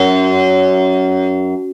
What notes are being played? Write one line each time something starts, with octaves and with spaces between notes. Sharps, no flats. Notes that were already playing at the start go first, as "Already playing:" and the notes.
Already playing: F#2